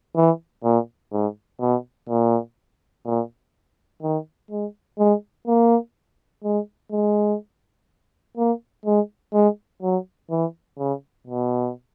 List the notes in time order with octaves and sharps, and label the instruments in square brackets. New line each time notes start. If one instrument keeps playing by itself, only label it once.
[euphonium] E3
A#2
G#2
B2
A#2
A#2
D#3
G#3
G#3
A#3
G#3
G#3
A#3
G#3
G#3
F#3
E3
C#3
B2